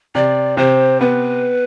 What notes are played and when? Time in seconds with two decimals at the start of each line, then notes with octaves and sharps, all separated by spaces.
0.15 C3 D5
0.57 C3 C5
1.01 B3 B4